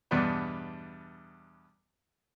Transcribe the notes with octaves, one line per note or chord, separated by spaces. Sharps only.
E2 G2 B2 B3 D4